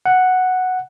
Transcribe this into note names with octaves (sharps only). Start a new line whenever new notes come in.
F#5